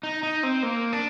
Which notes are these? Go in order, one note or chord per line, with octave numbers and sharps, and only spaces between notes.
D#4
D#4
C4
A#3
D4